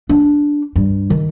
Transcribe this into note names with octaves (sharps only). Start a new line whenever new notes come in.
D4
G2
D#3